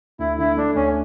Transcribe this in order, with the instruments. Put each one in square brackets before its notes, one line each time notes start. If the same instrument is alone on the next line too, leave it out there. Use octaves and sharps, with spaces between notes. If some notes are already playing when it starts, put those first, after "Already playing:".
[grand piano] D2 [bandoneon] E4
[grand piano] D3 [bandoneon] E4
[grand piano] A3 [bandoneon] D4
[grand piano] D2 [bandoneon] C#4